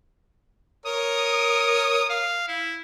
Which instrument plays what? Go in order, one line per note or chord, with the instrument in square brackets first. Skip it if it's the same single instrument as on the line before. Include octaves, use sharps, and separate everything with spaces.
[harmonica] A#4 C#5 [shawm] D#6
[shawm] F5
E4